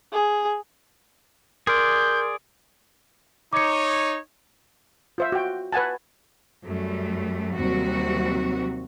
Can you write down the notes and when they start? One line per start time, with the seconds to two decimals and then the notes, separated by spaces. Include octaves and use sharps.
0.13 G#4
1.67 G#4 A#4 D5 C6 F6 G6
3.53 D#4 C#5 D6 C#7
5.18 F4 C5 E5
5.32 F#4 G5
5.73 B4 F#5 G#5 A5
6.65 F#2 G3 A3
7.54 D#2 C3 F#3 G3 C4 F#4